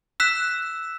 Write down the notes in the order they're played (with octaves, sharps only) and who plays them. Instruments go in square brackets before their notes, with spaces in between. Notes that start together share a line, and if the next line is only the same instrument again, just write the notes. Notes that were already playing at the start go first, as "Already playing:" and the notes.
[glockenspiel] E6 F#6 B6 E7